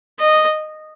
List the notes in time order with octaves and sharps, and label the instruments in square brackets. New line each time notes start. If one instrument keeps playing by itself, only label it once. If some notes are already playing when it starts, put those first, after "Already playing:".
[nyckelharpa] D#5